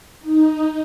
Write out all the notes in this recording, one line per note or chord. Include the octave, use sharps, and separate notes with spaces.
D#4